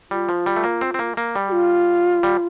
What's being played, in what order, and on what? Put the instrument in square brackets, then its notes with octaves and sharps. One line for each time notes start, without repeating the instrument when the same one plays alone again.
[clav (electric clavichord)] G3 [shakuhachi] F4
[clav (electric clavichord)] F3
G3
A3
A#3
C4
C4
A#3
A#3
G3
[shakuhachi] G4
F4
[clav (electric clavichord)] G3